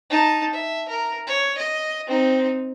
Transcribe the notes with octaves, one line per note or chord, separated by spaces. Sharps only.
D#4 A5
E5
A#4
C#5
D#5
C4 D#4